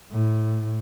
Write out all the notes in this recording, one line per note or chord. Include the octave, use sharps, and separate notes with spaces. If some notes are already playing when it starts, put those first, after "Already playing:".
A2